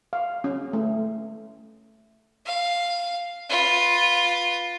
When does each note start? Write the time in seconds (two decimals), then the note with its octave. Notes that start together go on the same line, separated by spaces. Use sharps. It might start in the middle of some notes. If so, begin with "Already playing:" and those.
0.13 F5
0.44 C#4
0.73 A3
2.46 F5
3.50 F4 B4